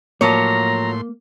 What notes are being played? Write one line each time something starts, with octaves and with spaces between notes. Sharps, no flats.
A2 F3 F#3 A#3 C#5 A#5 C6